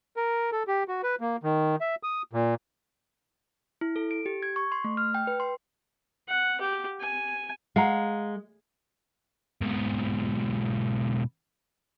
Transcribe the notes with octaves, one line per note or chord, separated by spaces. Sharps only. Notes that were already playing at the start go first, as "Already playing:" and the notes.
A#4
A4
G4
F#4
B4
A#3
D#3
E5
D#6
A#2
E4
A4
D7
G4
G#6
C#6
C6
A3
F6
G5
B4
C6
F#5
G4
G#5
G#3 F5 F#5 A#5
G#2 B2